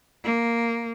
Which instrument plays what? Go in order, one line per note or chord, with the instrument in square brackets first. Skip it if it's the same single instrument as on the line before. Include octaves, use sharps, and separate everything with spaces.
[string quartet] A#3